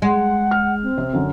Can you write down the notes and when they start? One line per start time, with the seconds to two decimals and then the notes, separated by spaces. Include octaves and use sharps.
0.02 G#3 F#5
0.51 F6
0.83 C4
0.98 C3
1.13 F#2 D3